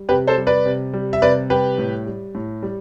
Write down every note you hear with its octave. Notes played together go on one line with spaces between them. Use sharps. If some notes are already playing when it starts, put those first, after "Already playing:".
Already playing: G3
C3 G4 B4
A4 C5
G3
B4 D5
C3
G3
E5
C3 B4 D5
G3 G4 B4
A2
G3
A2
G3